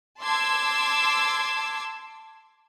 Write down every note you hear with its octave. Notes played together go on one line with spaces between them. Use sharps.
A5 C6 D6 E6 G#6